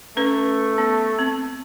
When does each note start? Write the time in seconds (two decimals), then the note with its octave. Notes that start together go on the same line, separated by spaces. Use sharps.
0.17 A3 C#4 B4
0.78 B3
1.19 C4